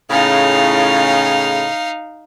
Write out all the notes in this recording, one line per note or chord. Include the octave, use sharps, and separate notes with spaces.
A2 C#3 D#4 F5